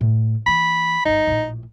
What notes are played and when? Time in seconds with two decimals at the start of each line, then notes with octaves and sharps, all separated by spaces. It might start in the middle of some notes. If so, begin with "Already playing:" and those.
0.01 A2
0.46 E3 A#3 B5
1.05 G#1 G2 D#4
1.27 A#1 A2